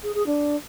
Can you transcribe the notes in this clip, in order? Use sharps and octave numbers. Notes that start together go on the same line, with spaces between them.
G#4
G#4
D4